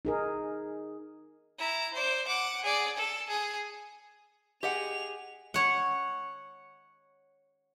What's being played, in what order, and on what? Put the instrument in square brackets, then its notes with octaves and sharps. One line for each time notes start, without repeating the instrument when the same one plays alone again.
[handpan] D#4 G#4 A#4
[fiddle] E4 A#5
C5 D5
F#5 D6
G#4 D5
A4
G#4
[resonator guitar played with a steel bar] G4 D#5 F#5 [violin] G#4 F7
[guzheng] C#5 F#5